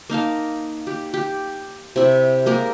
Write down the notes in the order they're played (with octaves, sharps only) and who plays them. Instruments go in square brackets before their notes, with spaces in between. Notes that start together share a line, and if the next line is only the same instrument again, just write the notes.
[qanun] A#3 D#4 F5 A5
G4
G4
C3 E4
G#3 A#3 G4 A#4